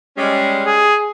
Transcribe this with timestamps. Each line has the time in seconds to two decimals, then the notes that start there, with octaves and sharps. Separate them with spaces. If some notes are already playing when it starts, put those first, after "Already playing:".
0.17 G3 G#3 C#4
0.67 G#4